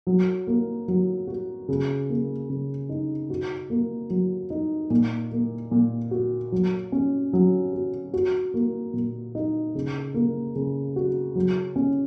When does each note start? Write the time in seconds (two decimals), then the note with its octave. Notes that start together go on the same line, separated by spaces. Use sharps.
0.07 F#3
0.47 A#3
0.88 F#3
1.28 F#4
1.68 C#3
2.09 A#3
2.50 C#3
2.89 D#4
3.30 F#4
3.70 A#3
4.10 F#3
4.50 D#4
4.90 A#2
5.32 A#3
5.71 A#2
6.11 F#4
6.52 F#3
6.92 C#4
7.33 F#3
7.73 F#4
8.13 F#4
8.54 A#3
8.93 A#2
9.35 D#4
9.75 C#3
10.14 A#3
10.55 C#3
10.96 F#4
11.35 F#3
11.76 C#4